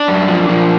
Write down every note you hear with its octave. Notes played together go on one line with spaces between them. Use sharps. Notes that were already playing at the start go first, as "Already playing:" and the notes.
Already playing: D4
F#2
F3
F3